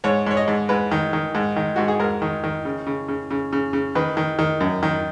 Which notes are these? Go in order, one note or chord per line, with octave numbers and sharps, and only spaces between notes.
G#2 C#5
G#2 C#5
D#5
G#2
G#2 B4
D#3
D#3
G#2
D#3
G#2 F#4
G#4
G#2 A#4
D#3
D#3
C#3
C#3
C#3
C#3
C#3
C#3
D#3 B4
D#3
D#3
F#2
D#3